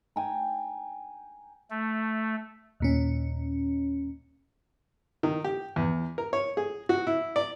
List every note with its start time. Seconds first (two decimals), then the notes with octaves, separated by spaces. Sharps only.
0.16 G5 G#5 A#5
1.70 A3
2.80 D#2 A#2 C#4
5.23 D#3
5.44 G4
5.76 E2
6.18 A#4
6.33 C#5
6.57 G#4
6.89 F#4
7.07 E4
7.36 D5